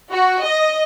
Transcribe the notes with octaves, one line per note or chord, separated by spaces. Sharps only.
F#4
D#5